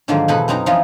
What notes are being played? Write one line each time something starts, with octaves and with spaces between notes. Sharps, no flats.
G#2 D3 D#3 F3 F#3 A#3
E2 B2 A4 C5 G#5 B5
F#2 C4 C#4 D#4 A#5
E3 F3 B3 C#4 D#4 F4